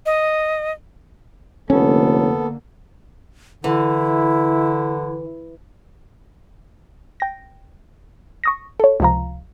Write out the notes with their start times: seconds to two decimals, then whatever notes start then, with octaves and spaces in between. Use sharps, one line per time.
0.06 D#5
1.70 F1 D3 A#3 B3 C#4 A4
3.64 D3 E3 E4
7.20 G5 A#6
8.44 C#6 D#6 A#6
8.80 A4 C#5
9.00 C#2 C3 F3 F5 A#5